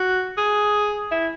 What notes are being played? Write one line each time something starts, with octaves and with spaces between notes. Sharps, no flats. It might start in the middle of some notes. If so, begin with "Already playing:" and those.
Already playing: F#4
G#4
E4